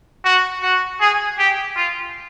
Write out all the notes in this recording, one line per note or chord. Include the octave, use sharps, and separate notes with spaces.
F#4
F#4
G#4
G4
F4